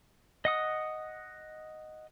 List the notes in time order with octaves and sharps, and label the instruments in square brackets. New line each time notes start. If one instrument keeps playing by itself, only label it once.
[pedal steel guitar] D#5 F#5 D#6